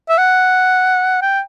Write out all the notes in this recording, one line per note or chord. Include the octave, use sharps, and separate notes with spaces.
E5
F#5
G5